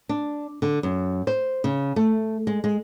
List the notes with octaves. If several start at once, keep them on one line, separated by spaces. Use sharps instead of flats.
D4
D3
F#2
C5
C#3
A3
G#3
G#3